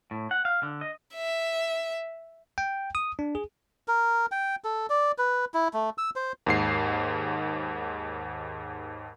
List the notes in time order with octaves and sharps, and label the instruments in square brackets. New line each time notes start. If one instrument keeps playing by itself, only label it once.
[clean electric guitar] A2
F#5
F5
D3
D#5
[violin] E5
[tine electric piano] G5
D#6
D4
G#4
[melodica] A#4
G5
A4
D5
B4
E4
A3
E6
C5
[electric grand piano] D#2 G#2 C7